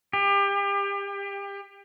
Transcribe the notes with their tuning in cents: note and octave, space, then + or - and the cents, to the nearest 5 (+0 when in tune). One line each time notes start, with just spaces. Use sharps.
G4 +30